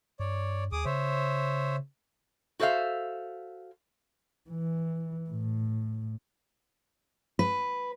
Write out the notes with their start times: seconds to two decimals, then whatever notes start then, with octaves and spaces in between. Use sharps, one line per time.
0.20 G2 C#5 D5
0.72 D#2 G#4 D6 D#6
0.85 C#3 C5 C#5 E5
2.60 F#4 A4 C5 E5 F5
4.50 E3
5.30 A2
7.39 B4